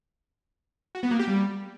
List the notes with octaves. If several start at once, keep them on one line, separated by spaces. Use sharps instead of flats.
F#4
B3
A#3
G4
G3